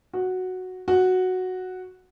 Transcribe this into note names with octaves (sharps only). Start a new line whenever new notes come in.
F#4
F#4